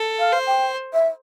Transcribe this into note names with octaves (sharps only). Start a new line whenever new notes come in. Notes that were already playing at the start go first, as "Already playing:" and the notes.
Already playing: A4
F5
C5
G5
E5